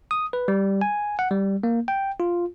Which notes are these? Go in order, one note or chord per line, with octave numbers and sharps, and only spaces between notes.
D#6
B4
G3
G#5
F#5
G3
A#3
G5
F4